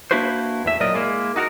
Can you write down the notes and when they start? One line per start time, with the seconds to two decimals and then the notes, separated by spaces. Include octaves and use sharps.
0.11 A#3 D4 E4 F#4 B4 C5
0.65 E2 A2 E5
0.80 A#2 F#3 A#4 D5 D#5
0.94 G#3 A#3 E4
1.36 D#4 F#4 A4 A#4